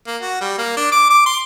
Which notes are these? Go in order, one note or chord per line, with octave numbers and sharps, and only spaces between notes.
A#3
F#4
G3
A#3
D4
D6
D6
C6